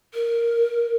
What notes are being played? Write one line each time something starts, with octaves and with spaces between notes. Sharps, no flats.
A#4